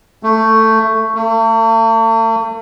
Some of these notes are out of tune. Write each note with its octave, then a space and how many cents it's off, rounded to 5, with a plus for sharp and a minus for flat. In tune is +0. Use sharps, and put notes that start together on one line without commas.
A3 +15
A3 +45